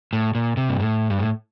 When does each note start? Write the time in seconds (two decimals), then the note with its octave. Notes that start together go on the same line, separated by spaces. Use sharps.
0.13 A2
0.35 A#2
0.57 C3
0.69 G2
0.80 A2
1.10 G2
1.19 A2